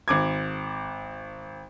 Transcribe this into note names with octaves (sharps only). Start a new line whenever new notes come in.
G#1 D6 G#6